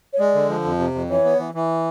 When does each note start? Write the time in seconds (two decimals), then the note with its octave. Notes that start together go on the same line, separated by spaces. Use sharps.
0.13 C#5
0.19 G#3 D5
0.35 D3
0.49 F3
0.65 F2
0.79 C3
0.95 F2
1.10 E3 C#5
1.25 B3
1.39 E3
1.55 E3